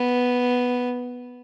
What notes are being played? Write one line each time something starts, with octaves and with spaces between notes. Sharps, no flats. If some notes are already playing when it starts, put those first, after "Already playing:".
Already playing: B3